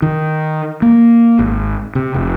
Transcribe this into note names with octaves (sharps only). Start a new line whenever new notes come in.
D#3
A#3
G#1
C3
F1